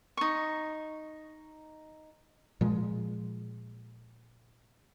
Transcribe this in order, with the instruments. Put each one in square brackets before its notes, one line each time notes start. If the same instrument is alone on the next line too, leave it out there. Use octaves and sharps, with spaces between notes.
[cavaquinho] D#4 C#6
[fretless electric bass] A#2 F3 G#3